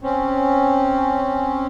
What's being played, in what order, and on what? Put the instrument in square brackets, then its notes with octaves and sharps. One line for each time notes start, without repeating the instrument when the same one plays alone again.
[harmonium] C4 C#4